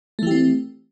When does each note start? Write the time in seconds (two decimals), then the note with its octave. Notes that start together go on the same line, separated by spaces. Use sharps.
0.19 A3
0.23 E3
0.27 G4
0.31 C4